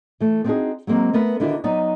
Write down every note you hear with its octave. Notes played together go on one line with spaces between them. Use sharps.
E3 A3
B3 C4 D4 D#4 F#4 G#4
F#3 G#3 A#3 C4
A3 B3 A#4 B4
D3 D#3 D4 E4 F#4 A#4
F#3 B3 D#4 D5 D#5